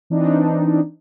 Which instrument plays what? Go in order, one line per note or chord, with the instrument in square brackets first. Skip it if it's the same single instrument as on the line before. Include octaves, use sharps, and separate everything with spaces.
[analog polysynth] E3 C4 D4 D#4